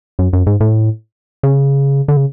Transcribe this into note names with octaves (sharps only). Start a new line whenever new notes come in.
F#2
F#2
G#2
A2
C#3
D3
C#3